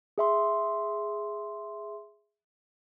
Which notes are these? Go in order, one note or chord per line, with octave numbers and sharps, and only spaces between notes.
G#4 E5 C6